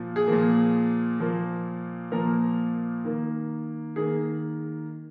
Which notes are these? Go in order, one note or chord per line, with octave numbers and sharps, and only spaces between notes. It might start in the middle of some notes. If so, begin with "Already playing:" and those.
Already playing: A#2 F3
G#4
A#2 F3 A#3
A#2 F3 A#3
A#2 F3 A#3 A#4
D#3 A#3
D#3 A#3 G#4